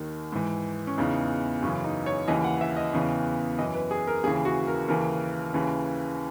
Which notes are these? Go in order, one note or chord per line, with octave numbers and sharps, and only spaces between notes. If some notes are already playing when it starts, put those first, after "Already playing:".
Already playing: D#2 D#3
G#2 E3
C#4
E2 C#3 E3 D#4
F#2 C#3 E3 C#4
D#4
C#5
D#2 C#3 E3 D#5
F#5
E5
D#5
E2 C#3 E3
F#2 E3 D#5
B4
G#4
A#4
D#2 C#3 E3 G#4
F#4
A#4
D#2 C#3 E3 A#4
D#2 C#3 E3